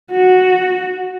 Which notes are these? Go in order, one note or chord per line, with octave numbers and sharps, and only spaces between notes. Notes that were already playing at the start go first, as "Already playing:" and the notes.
F#4